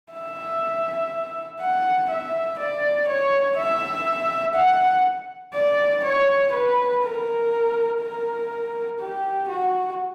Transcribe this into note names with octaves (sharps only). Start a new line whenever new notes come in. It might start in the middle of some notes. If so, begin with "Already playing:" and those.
E5
F#5
E5
D5
C#5
E5
F#5
D5
C#5
B4
A#4
A#4
G4
F#4